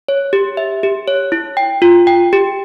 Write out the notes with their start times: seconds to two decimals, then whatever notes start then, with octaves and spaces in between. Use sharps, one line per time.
0.09 C#5
0.33 G4
0.57 E5
0.83 G4
1.08 C#5
1.32 E4
1.57 G5
1.82 F4
2.07 G5
2.33 G4